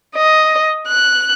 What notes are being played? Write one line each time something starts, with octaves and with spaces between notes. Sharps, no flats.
D#5
F#6